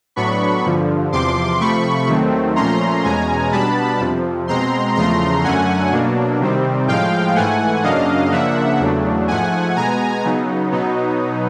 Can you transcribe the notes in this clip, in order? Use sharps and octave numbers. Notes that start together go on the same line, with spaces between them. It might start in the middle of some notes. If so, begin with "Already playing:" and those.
A2 F#3 B3 D4 B5 C#6
G2 D3 F3
E2 C3 F3 C6 D6
C3 F3 A3 B5 C#6
D#2 D#3 F#3 A3 C4
A#2 F3 A3 C#4 A#5 C6
E2 B2 G#3 C#4 G#5 A#5
B2 G3 B3 D4 A5 B5
F2 C3 F3
B2 G#3 C4 A#5 C6
E2 C#3 F3 A3 A#5 C6
F#2 D3 F#3 A3 C#4 F#5 G#5
B2 F#3 A#3 D4
C3 D#3 G3 C4
A2 F3 G#3 F5 G5
G#2 E3 A3 F#5 G#5
F#2 C#3 F#3 A#3 D4 D#5 F5
C#3 F3 A#3 D4 E5 F#5
E2 C#3 F#3 A3 D4
G#2 F3 A3 F#5 G#5
B2 G#3 B3 G#5 A#5
C#3 F#3 B3 D#4
B2 F#3 B3 D#4